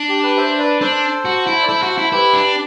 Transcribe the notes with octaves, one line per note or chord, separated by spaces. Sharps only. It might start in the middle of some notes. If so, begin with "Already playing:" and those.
Already playing: D4
G4
G4 B4
C5 E5
C5
B4 D5
D4 A4 C5
F#4
E4
D5
E4 A4 C5
F#4
E4
E4 G4 B4
D4